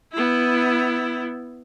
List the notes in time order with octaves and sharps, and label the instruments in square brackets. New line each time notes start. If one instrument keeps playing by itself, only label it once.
[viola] B3 E4